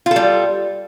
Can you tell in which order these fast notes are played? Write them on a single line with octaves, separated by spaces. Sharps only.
F4 A4 G3